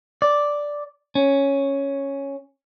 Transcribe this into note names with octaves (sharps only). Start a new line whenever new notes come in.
D5
C#4